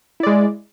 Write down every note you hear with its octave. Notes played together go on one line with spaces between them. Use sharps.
G#3 E4 D5